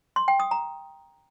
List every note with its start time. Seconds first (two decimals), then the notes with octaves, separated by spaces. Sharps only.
0.16 C6
0.28 G5
0.40 D#6
0.51 A#5